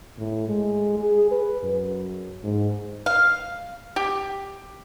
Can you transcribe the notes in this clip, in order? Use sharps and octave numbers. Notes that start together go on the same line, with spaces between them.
A2
G#3
G#4
B4
F#2
G#2
F5
G4